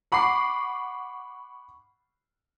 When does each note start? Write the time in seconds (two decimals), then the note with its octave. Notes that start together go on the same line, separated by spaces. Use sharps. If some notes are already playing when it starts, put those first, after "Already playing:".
0.12 F#5 B5 C#6 D6 C7